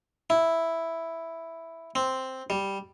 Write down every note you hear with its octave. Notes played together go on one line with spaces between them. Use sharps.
E4
C4
G3